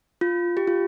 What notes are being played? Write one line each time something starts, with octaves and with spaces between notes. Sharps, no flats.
F4
G4
F4